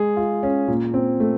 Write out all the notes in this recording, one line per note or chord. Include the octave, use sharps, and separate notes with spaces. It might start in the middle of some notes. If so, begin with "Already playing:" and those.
Already playing: G#3 G#4
F4
C#4
A#2
C4
A3